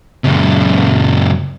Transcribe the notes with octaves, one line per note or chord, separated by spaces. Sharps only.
C#2 F#2